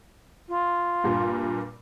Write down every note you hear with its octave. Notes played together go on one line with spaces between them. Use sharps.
F4
G2 A#2